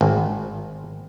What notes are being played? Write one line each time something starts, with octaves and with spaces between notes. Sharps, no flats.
G#1